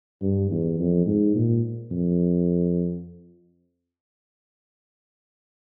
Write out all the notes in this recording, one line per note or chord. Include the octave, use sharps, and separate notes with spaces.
G2
E2
F2
G#2
A#2
F2